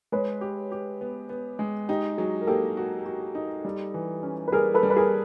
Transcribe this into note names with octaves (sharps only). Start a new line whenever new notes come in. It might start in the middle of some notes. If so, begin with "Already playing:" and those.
G#3 B4 C#5
G4
G4
B3
B3
G#3
D#4 G4
F#3 G#4
A#4
A#3 G4 A4
F#4
F#4
D#4
G3
E3
C#4
B4
G3 G#4 A#4
A4 B4
G3
B4
G#4 A#4